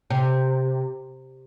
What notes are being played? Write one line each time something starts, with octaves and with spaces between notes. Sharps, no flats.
C3